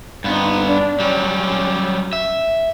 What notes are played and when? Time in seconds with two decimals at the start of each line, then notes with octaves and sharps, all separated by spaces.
0.24 G2 B3 C4 D#4
0.66 D4
1.00 F#3 G3 C#4
2.13 E5